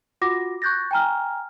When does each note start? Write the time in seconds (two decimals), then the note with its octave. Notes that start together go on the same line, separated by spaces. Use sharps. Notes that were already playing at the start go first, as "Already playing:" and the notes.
0.21 F4 F#4 F#5 D6 A#6
0.62 C#6 F#6 G6 A6 A#6
0.91 G5 G#5 A#5 F6